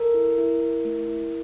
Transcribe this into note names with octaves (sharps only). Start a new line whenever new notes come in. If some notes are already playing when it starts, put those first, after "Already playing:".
Already playing: A4 A#4
E4
E4
E4
A3
E4